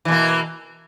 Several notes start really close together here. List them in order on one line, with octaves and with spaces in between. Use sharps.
E3 B2 A#3